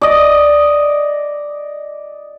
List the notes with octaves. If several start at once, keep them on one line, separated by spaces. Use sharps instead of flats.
D5 D#5